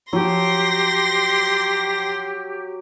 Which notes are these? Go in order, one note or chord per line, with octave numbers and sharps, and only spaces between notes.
F3 F#3 G4 C6 A#6